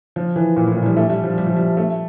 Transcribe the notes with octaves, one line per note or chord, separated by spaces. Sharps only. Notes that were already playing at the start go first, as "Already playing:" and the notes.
F3
E3
A#2
A2
A#2
F3
G3
A3
G3
F3
G3
F3
G3
A3